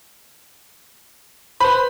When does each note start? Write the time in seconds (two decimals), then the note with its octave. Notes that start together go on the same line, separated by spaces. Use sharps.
1.60 B4 C5 B5